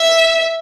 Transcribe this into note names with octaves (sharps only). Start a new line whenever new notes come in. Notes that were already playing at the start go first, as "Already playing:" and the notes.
Already playing: E5